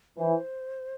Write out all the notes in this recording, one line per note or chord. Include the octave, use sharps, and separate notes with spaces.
E3 C5